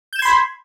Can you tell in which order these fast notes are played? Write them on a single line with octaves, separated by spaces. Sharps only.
G6 E7 G#6 C6 B5